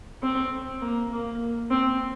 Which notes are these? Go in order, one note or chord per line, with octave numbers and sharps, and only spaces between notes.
C4
A#3
A#3
C4